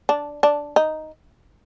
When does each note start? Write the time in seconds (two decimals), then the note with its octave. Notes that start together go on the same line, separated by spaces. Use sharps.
0.09 D4
0.43 D4
0.76 D#4